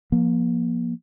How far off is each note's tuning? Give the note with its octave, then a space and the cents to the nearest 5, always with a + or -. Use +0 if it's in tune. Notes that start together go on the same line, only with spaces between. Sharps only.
F3 +0 A#3 +30